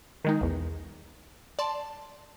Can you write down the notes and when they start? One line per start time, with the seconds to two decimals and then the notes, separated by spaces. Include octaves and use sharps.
0.24 D#3 G#3 D#4
0.41 B1 E2
1.59 D5 A5 C6